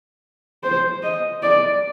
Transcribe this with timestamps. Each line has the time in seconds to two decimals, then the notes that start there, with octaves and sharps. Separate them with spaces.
0.64 C5
1.03 D#5
1.43 D5